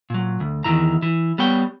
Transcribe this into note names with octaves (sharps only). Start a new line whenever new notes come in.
A#2 F#3
D2
E2 G#2 D#3 E3 A#5
E3
G3 B3 C#5 G5